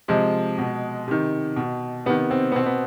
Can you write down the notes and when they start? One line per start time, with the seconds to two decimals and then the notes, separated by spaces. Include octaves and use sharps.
0.08 C3 F3 G#3
0.58 B2
1.08 C3 D#3
1.56 B2
2.06 C3 B3
2.09 D#3
2.31 C4
2.52 B3
2.55 B2 C4
2.66 B3